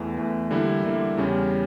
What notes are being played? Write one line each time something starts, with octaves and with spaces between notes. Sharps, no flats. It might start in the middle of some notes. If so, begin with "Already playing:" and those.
Already playing: E2 E3 A3
E2 E3 A3
D3 G3 A#3 E4
D3 G3 A#3 E4
E2 C#3 G3 C#4